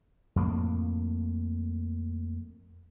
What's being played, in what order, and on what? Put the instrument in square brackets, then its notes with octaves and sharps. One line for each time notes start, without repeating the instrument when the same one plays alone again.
[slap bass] F2 A2 A#3